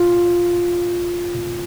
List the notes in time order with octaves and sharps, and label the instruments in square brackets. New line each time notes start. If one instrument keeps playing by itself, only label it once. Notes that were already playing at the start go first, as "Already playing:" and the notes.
Already playing: [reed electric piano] F4